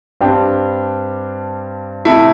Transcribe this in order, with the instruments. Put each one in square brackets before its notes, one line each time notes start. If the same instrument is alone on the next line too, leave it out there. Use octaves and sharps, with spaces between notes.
[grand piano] G2 G3 C4 [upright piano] D4 G4
[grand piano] C3 A3 [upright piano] E4 A4